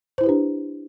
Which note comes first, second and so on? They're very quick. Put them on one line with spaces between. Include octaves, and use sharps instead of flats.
C5 E4 B4 G4 D4